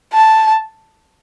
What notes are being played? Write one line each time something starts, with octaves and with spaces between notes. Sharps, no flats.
A5